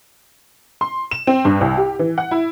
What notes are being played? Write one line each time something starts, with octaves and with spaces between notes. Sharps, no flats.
C6
E7
C4
G2
C2
G4
E3
F#5
E4